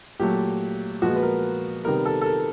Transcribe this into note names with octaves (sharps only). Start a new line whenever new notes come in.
A#2 F#3 A3 G4
A#2 F3 G#3 B3 F#4
B4
A#4
C3 D#3 G3 B3 A#4
A4
A4
A#4